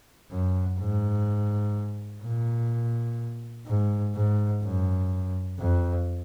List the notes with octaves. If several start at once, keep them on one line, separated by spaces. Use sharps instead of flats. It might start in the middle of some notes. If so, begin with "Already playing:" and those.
F#2
G#2
A#2
G#2
G#2
F#2
F2